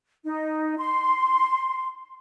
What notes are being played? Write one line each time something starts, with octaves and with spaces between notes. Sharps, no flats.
D#4
C6